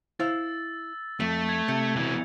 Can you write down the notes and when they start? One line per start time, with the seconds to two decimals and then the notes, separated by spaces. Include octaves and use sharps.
0.19 E4 C5 F5 E6 A6
1.20 F2 A3
1.49 G#6 F7
1.68 C3 G6 C#7
1.96 B2 E3